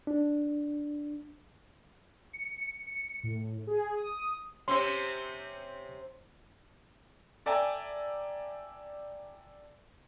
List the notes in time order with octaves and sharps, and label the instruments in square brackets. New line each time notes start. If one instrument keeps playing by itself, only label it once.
[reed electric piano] D4
[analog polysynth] C#7
A2
G#4
D#6
[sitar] C3 C4 C#4 [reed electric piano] C6
[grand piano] A4 D5 E5 G5 G#5 A#5